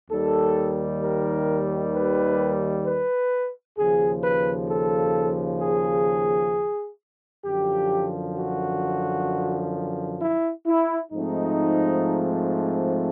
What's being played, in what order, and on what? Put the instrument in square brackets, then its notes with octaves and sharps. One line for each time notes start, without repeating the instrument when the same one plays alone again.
[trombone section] D#2 D#3 G3 A4
A#4
B4
B4
D#2 C#3 F3 G#4
B4
A4
G#4
F#2 D3 F3 G4
F#4
E4
E4
G#2 F3 A3 C4 D#4